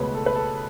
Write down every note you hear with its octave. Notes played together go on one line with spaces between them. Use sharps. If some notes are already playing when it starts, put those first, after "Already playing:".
Already playing: C#2 B2 A3 G#4 B4 C#5
A4
B4
A4